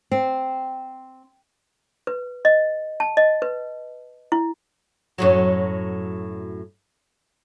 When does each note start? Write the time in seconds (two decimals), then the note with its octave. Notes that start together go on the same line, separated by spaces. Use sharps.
0.11 C4
2.07 B4
2.45 D#5
3.00 A5
3.17 D#5
3.42 B4
4.32 E4
5.18 F#2 A2 F#3